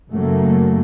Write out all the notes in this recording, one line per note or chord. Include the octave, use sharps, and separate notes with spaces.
F#2 C#3 F#3 A3 A#3